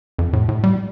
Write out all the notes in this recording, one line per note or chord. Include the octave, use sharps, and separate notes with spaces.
F2
A2
A2
G3